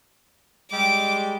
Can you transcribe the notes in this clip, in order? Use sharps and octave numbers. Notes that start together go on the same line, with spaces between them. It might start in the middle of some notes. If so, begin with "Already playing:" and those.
G3 G#3 D6